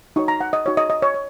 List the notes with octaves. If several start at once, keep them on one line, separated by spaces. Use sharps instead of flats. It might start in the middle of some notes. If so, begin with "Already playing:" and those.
D#4 F#4 C#5 C#6
A#5
F#5
D#5
D#4 F#4 C#5
D#5
D#5
C#5
C#5